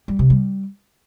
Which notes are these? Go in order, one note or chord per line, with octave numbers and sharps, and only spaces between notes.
G3
C3
G3